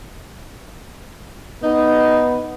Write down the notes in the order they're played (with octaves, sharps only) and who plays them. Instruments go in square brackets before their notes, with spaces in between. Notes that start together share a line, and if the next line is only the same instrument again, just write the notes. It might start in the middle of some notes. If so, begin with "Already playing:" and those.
[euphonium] B3 [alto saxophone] D#4